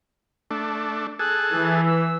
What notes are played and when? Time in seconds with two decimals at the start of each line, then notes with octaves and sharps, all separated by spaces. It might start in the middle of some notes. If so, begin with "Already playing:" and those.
0.51 A3 D4
1.19 G#4 A4 F#6
1.52 E3
1.86 E6